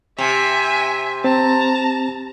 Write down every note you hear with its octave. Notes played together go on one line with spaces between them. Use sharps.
C3 E5 G#5
C4 A5 A#5